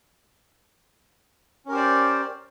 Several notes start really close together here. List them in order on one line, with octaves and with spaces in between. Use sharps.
C#4 A#4 G4 C5 D5